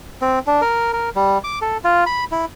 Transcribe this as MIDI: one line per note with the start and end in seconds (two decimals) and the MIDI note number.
0.22 0.39 60
0.47 0.61 62
0.61 0.93 70
0.93 1.10 70
1.16 1.38 55
1.44 1.59 86
1.62 1.77 69
1.84 2.04 65
2.06 2.24 83
2.32 2.45 64